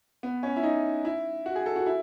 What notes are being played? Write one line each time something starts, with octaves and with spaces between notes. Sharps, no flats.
B3
C#4
E4
D#4
E4
F#4
G#4
A4
F#4
E4